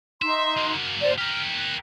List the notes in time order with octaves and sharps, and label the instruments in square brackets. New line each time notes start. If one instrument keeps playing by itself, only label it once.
[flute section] D#4 C6 [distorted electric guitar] E5
[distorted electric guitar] F#3 A#3
[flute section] C5 D5
[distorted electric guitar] G4 A#4 [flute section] F6
[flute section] F#6